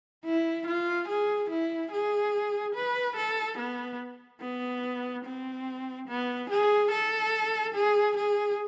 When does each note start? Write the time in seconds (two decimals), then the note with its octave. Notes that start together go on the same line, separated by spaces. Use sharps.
0.25 E4
0.67 F4
1.08 G#4
1.50 E4
1.92 G#4
2.75 B4
3.16 A4
3.58 B3
4.41 B3
5.25 C4
6.08 B3
6.50 G#4
6.91 A4
7.74 G#4
8.17 G#4